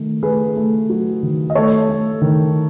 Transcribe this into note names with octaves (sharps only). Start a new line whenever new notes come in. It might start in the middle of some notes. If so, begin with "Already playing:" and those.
Already playing: D#3 A3
A3 G#4 B4
A3
F#3
D#3
D#5
A3 A4 C#5
A3
D#3